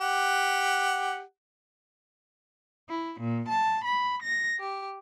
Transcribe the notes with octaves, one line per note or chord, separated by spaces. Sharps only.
G4 F#5
E4
A#2
A5
B5
A#6
G4